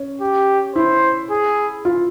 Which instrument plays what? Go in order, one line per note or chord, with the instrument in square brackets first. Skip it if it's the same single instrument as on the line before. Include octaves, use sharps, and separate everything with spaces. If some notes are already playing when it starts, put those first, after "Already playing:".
Already playing: [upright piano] C#4
[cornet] G4
[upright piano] E4 [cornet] C5
[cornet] G#4
[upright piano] F4